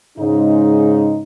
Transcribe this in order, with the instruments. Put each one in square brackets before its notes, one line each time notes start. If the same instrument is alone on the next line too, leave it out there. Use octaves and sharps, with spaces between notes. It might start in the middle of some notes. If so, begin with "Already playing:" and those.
[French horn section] G#2 C#3 G#3 D#4